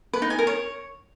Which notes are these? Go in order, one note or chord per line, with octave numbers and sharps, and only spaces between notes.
B4
D#4
G#5
A#4
C#5